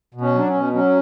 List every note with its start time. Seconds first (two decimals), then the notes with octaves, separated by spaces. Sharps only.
0.14 B2
0.21 C#4
0.34 F#3 D4
0.47 C#4
0.54 B2
0.73 F#3 C#4